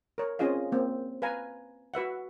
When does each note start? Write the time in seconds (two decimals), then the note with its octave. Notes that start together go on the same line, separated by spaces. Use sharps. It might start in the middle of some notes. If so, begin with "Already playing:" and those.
0.18 A#4 C#5
0.39 C4 C#4 F4 G#4 D#5 F5
0.72 A#3 C4
1.22 B4 F5 G#5 A#5
1.94 F#4 B4 E5 F#5